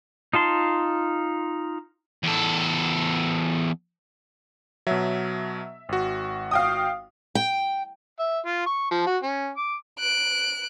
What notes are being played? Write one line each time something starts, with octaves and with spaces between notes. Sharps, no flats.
D#4 F4 A5 C6
E2 A4
B2 F#3 E5
G#1 F#4
F5 G5 D#6
G5
E5
F4
C#6
F3
F#4
C#4
D6
F#6 D7